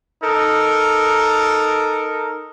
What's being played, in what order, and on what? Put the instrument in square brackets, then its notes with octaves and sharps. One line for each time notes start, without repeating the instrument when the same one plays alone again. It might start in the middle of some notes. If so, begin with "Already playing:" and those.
[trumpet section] D#4 A4 A#4